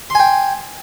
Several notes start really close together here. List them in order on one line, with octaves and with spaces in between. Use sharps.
C6 G#5 G5